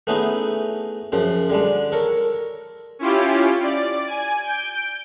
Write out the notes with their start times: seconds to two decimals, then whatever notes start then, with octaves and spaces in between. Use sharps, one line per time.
0.07 A3 B3 C#4 D#4 E4 G#4
1.12 F#2 C#3 F3
1.50 D3 G3 G#3
1.92 A4 A#4 C#5
2.99 C#4 E4 F4 G4
3.63 D5
4.07 G#5
4.44 G6 D7